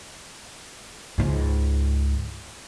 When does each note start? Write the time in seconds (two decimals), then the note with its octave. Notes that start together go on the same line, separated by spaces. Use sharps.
1.18 C#2 G#2